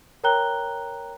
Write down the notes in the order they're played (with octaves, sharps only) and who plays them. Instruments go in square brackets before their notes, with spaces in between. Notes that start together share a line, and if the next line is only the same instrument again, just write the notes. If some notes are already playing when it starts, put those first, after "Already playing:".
[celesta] A#4 C#5 G5 A#5 F#6 G7